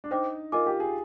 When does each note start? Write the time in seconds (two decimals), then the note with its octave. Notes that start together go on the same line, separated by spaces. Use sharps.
0.04 D4
0.11 D#4 C5 G5 D6
0.52 F4 A#4 D#5 G#5 D6
0.66 G4
0.80 G#4